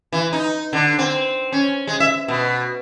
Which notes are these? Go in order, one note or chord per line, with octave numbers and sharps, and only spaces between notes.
E3
D#4
D3
C4
C#4
G#3
E5
B2